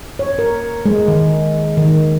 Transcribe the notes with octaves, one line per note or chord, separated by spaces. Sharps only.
C#5
A#4
G#3
D#3
D#3